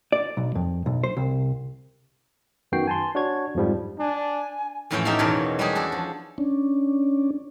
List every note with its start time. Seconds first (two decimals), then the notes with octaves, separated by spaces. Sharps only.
0.12 D5
0.37 B1
0.55 F2
0.86 B1
1.04 C5
1.17 C2
2.72 F#2 D#3 B3 F#4 G5 C7
2.88 G#5 A5 C6
3.15 D4 F#4 C#5 G#6
3.55 F2 G#2 F3 G3
3.99 D4 G#5
4.91 F2 A2 E3 B3 C#4 G5
5.05 C#4 D#4 G4 A4 E5 F5
5.19 E2 B2 D#3 F#3 A#4 C#5
5.59 G3 G#3 C#4 D4 G4 G#4
5.75 F#4 G#4 A4
5.92 F3
6.38 C#4 D4